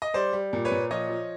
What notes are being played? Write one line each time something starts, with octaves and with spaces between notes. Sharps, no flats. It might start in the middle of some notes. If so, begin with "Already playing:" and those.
D#5
G3 C5 D5
G3
A#2
B4 C#5
A#2
F3 C#5 D#5
F3